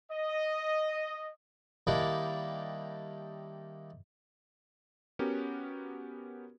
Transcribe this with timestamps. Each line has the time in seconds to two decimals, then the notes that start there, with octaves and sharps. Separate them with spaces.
0.11 D#5
1.87 D#3 G3 A#3 D4 E4
5.19 B3 C#4 F#4 G4 A#4